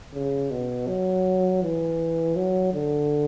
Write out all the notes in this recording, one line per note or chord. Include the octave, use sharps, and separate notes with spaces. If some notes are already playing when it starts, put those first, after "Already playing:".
C#3
B2
F#3
E3
F#3
D3